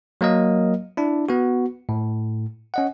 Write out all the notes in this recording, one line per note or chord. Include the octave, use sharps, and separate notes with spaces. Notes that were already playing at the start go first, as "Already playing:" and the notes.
F#3 A#3 A#4 D#5
D4 E4
B3 F#4
A2
C#4 D#5 F#5